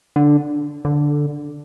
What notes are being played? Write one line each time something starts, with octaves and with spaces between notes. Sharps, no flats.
D3
D3